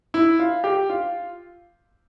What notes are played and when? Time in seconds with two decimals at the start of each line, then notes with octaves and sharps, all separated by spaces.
0.14 E4
0.39 F4
0.64 G4
0.89 F4